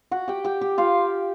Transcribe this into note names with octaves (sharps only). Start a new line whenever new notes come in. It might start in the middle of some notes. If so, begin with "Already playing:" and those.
F#4 F#5
G4 G5
G4 G5
G4 G5
F4 F5